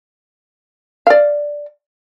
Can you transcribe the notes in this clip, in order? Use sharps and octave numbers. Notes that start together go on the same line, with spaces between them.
D5 F5